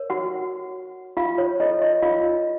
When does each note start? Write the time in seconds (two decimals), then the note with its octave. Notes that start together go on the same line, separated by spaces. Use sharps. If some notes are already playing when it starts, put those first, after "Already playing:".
Already playing: A#4 C#5
0.10 F#4 F#5
1.17 F4 F5
1.38 C#5
1.60 F4 A4 C#5 D#5
1.82 D#5
2.02 F4 F5